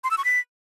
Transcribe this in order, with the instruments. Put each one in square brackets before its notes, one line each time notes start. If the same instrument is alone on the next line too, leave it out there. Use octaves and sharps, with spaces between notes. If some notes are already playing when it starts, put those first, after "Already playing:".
[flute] C6
E6
C#6
B6